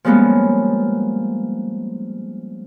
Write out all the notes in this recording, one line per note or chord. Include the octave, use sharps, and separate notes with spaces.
F3 G3 G#3 A#3 B3 C#4